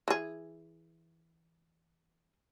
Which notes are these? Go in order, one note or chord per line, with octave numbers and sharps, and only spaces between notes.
E3 G#4